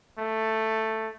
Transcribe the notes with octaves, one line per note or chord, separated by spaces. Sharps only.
A3